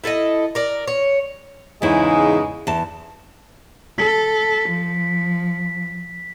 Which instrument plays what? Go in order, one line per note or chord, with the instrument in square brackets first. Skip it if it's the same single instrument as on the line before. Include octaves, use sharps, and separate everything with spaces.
[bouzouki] E4 A4 B4 D#5
A#4 D5
C#5
[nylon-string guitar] E2 E4 [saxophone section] G#2 C#3 G#3
[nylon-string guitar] E2 A5
[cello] A4 [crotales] B6
[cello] F3